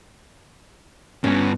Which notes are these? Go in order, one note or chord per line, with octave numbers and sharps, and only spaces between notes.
G2 B3 C#4